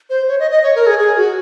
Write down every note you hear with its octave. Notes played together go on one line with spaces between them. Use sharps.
C5
C#5
D#5
D#5
C#5
A#4
G#4
G#4
F#4